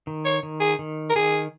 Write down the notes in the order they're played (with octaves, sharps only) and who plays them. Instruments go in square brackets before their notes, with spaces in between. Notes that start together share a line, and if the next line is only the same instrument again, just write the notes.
[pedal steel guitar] D#3
[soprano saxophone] C#5
[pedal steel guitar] D#3
[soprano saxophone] G#4
[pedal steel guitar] D#3
[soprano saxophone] A#4
[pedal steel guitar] D#3 [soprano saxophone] G#4